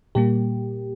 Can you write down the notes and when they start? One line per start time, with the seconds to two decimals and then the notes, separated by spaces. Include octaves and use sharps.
0.15 A#2 G3 A#3 G4